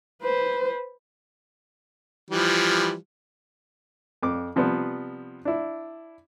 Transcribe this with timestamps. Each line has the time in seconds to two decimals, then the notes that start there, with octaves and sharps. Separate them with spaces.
0.22 B4 C5
2.30 E3 F3 G3
4.22 F2 D6
4.56 C3 F3 G3 B3
5.45 D4 E4